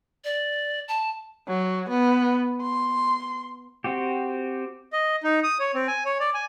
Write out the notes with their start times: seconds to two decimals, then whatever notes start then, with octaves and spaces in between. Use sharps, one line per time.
0.24 D5
0.88 A5
1.49 F#3
1.90 B3
2.62 C6
3.84 C4 F#4 G4
4.93 D#5
5.23 D#4
5.43 D#6
5.60 C#5
5.75 C4
5.88 G#5
6.05 C#5
6.20 D5
6.34 G#5